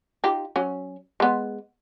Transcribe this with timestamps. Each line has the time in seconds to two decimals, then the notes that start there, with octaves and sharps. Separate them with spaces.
0.24 D#4 F4 G4
0.56 F#3 C#4
1.20 G#3 B3